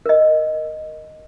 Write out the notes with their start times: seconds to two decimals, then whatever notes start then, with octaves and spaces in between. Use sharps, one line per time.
0.06 A#4 D#5